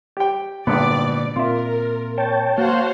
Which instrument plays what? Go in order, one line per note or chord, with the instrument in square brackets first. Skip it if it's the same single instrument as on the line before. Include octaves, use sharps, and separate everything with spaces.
[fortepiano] G4 G5
[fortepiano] G#1 G2 B3 [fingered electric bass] A#2 D3 [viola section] D5
[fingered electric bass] A#2 C4 [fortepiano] F4 E5 [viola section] A#4
[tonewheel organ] C#5 G5 A5
[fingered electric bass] A#3 [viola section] F#4 C5 C#5 [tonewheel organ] F5 F#5 A5